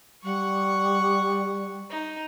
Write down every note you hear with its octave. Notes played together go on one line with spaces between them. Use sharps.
G3 F#5 C#6
D#4